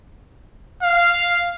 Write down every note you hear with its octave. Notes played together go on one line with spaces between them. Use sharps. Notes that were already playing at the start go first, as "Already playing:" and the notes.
F5